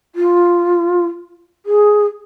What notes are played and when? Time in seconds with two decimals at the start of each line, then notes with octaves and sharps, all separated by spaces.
0.15 F4
1.66 G#4